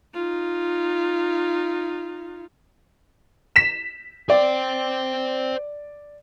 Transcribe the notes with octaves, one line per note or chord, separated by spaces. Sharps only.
D#4 F4
B6 E7
C5 D5 G5